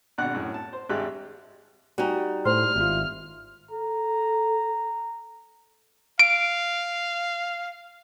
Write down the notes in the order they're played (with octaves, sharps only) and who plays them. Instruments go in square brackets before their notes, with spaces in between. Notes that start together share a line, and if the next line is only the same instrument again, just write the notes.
[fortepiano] G#1 B2 D4 F#5 F#6
F#2 A2
A5
C5
G#1 G2 G#3 G4 E5 F#6
[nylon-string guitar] G3 D#4 [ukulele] F#4 G#5
[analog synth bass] A2 [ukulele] C5 [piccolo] F6
[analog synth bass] G#1 [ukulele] E4 F4
[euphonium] A4 [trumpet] A#5
[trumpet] F5 [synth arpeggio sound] D7